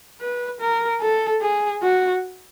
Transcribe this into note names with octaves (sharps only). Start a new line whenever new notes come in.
B4
A#4
A4
G#4
F#4